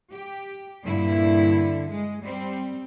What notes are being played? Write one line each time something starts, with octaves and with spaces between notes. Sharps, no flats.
G4
G2 A#2 D3 E4
G#3
G3 C4